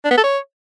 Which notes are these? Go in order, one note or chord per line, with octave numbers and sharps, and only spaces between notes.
D4
B3
A4
C#5